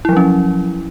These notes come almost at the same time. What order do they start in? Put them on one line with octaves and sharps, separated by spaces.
E4 F3 F#3 C#4